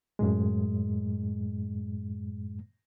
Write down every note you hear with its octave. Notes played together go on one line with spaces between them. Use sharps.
F#2 A2 G#3